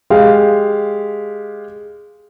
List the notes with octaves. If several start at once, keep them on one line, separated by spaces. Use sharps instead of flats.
G#3 G4 F5